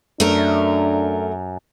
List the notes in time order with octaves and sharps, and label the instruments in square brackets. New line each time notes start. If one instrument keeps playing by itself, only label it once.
[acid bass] F#2 [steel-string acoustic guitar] A3 A#4 [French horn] D4